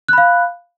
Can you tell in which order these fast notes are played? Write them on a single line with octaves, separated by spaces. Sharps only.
F#6 B5 F5